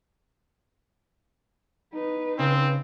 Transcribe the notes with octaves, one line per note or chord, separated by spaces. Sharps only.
D#4 B4
C#3 C4